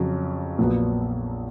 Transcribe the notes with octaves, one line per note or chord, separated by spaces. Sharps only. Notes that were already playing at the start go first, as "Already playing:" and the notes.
Already playing: F2 C#3 F#3
A#1 A#2 F#3 B3